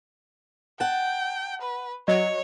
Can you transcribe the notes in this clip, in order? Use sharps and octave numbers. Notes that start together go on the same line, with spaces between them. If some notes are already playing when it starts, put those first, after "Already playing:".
F#5 G5 A5
B4
F#3 C#5 D#5